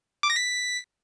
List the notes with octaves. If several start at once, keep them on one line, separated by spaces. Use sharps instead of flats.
D6
A#6
B6